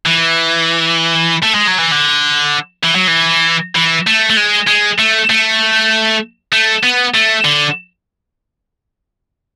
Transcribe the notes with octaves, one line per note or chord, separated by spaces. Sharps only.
E3
A3
G#3
F#3
E3
D3
E3
F#3
E3
E3
A3
A3
G#3
G#3
A3
A3
A3
B3
A3
D3